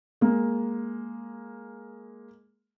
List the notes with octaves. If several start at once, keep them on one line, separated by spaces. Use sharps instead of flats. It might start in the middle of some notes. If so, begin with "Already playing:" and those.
G#3 A#3